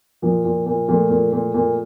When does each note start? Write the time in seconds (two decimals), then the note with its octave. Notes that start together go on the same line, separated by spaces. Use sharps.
0.22 A#2 F3
0.45 A#2
0.66 A#2
0.88 A#2 F3 A3
1.10 A#2
1.32 A#2
1.54 A#2